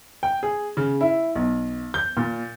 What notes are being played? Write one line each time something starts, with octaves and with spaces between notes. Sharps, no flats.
G5
G#4
C#3
E4
B1
G6
A#2